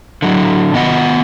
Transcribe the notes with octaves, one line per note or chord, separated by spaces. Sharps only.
D3 F#3
D#3 B3 D#5 F#5